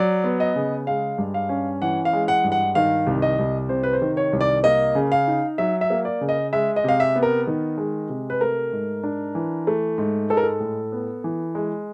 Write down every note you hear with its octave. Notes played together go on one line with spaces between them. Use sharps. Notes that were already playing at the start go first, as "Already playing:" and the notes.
Already playing: F#3 D5
B3
D#5
C#3
G#3 F5
G2
F5
C#4
E3 F#5
F5
G#3
F#5
G2
F#5
D#3 F5
C2
D#5
C2
C3 C5
B4
C5
D#3
C#5
C2
D5
A#3 D#5
C#3
F5
D#4
F#3 E5
E5
A#3
D5
C#3
D#5
G#3 E5
D#5
C3 F5
E5
B3
A#4
D#3
G#3
C3
B4
A3 A#4
G#2
D4
E3
A3
G#2
G#3 A4
A#4
A4
A2
B3
E3
G#3